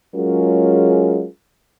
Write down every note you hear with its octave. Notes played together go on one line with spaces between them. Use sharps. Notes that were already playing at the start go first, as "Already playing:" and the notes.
F#3 G#3 C#4 F4 G#4 A#4